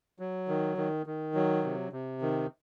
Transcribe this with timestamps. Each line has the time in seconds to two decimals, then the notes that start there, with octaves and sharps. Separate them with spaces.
0.19 F#3
0.48 D#3
0.77 D#3
1.06 D#3
1.35 F#3
1.64 C3
1.92 C3
2.22 D#3